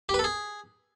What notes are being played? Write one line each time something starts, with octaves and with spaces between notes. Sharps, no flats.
G4
B4
A4
G#4